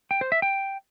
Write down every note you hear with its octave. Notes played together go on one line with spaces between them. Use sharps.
G5
C5
E5
G5